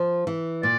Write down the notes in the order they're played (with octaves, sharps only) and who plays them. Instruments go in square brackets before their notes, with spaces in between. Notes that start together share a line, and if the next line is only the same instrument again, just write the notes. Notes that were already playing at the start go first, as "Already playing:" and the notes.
Already playing: [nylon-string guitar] F3
E3
[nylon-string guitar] A#2 [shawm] D5